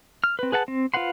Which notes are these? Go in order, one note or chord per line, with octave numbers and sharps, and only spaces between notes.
F6
C4 B4
G#4 B4 F#5 A5
C4
F4 B4 C5 F#5 C6